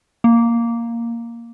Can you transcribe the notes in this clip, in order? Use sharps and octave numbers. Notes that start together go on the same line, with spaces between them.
A#3